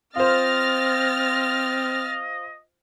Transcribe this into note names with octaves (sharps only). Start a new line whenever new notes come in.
C4 F4 C5 D#5 F6 A6 A#6